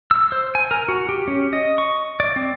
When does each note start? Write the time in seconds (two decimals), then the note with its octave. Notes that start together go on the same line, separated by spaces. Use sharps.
0.11 E6
0.32 C5
0.55 G#5
0.71 A#4
0.88 F#4
1.09 G4
1.28 C#4
1.53 D#5
1.78 C#6
2.20 D5
2.36 C4